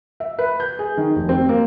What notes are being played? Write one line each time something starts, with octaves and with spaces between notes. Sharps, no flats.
E5
B4
G6
G#4
D#3
F1
C4
A#3